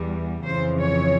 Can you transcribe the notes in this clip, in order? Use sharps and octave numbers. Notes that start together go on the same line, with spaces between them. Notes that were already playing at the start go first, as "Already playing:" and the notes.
Already playing: E2 E3 G3
F2 C#3 E3 C5
C#5